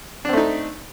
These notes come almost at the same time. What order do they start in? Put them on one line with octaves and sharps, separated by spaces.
D4 C4 A3 D#4